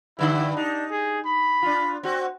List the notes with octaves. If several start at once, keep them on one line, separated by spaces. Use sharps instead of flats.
G2 D3 E4
D4 D#4
G#4
B5
D4 F4
C4 F#4